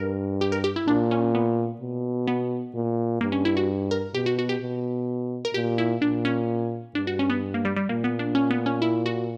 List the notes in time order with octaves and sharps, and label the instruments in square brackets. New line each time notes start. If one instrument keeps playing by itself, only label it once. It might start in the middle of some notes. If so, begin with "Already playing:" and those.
Already playing: [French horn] G2 [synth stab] A#4
[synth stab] G4
A#4
G4
E4
[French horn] A#2 [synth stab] D4
[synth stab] C#4
B3
[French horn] B2
[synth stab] B3
[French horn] A#2
[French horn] G2 [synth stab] A#3
[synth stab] C#4
E4
F#4
A#4
[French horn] B2 [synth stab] G4
[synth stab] F#4
F#4
G4
[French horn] B2
[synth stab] A#4
[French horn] A#2 [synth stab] G4
[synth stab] E4
[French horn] A#2 [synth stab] D4
[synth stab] C#4
[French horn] G2 [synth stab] D4
[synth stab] F#4
C#4
B3
A#3
G3
G3
[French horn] A#2 [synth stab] A#3
[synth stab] B3
D4
C#4
B3
C#4
E4
F#4